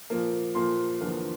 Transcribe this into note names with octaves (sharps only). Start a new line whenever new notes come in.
A#2 F3 A#3
A#2 F3 A#3 C6
E2 D3 F3 A#3